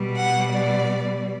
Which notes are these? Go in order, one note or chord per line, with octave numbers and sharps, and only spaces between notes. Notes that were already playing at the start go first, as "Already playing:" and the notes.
Already playing: B2 G3
F#5
D5